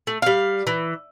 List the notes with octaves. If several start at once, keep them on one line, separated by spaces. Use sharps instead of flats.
A3
G3 F5
E3